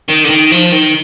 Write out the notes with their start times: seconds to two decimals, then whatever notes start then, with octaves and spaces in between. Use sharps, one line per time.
0.10 D#3
0.25 D3
0.30 D#3
0.52 F3
0.73 D#3